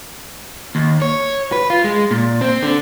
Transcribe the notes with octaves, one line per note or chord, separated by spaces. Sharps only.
D#2
C#5
B4
F4
G#3
A#2
C4
D3